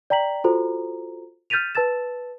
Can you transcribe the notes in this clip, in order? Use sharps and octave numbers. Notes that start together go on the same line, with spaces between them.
D5 G5 A#5 B6 F#7
F4 F#4 A4 C5 A#5
F6 G6 A6 B6 D#7 F7
B4 A5 E6 A6 E7